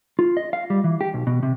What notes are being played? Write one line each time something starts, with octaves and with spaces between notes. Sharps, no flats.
F4
D#5
F5
G3
E3
G4
B1
B2
C3